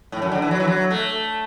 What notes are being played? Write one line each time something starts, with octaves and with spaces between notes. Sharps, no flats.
A2
F#2
D3
E3
F#3
E3
F#3
A3